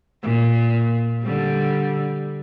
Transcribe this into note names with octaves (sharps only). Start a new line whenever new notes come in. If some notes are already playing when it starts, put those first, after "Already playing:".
A#2
D3 G3